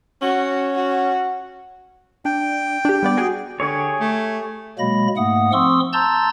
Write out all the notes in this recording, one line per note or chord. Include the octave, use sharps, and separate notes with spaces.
C#4 F#4
F#4
D4 G5
D4 G4
G3 B3 D5
F#4 G#4
D3 G4 G#4 C#5
A3
B2 F#3 G#3 A#3 B5 A#6
G#2 A3 A#3 F#5 D#6
F3 C4 C6 C#6 D#6 E6
A5 A#5 C6 E6 G6 A6